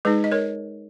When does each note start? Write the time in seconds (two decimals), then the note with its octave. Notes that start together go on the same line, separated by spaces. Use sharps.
0.05 G#3 D#4 G#4 B4
0.24 D#5
0.32 A#4 C#5